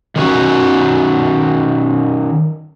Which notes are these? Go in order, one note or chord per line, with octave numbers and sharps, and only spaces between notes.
D#3 C#4 F#4